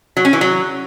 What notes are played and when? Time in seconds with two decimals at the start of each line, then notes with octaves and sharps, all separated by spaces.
0.17 F#3
0.25 C#4
0.33 E3
0.41 F#3